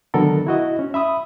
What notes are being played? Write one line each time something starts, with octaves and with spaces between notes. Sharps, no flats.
D3 D#3 F#3 B3 A4 A#4
E4 F#4 D#5
C#4
E5 B5 D#6